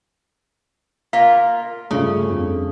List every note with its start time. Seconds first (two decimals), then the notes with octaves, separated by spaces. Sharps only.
1.13 A#3 F4 F5
1.91 G2 C#3 F3 A3
2.29 F2